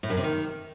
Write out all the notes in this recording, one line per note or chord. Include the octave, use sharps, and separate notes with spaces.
A2
F#2
C3
D#3